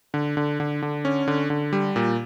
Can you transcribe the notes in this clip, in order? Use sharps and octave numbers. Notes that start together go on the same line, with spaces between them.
D3
D3
D3
D3
C#4
D3
D3
G3
A#2